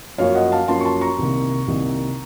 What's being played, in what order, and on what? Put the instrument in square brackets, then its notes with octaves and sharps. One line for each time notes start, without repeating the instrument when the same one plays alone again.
[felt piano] F#2 F3 A#3 C#4 C#5 F5
D#5 F#5
F5 A5
F#2 F3 A#3 C#4 A5 C6
C#6
A5 C6
A#5 C#6
C2 C3 D#3 A#3
C2 C3 D#3 A#3